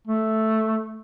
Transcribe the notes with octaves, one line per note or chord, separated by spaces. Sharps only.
A3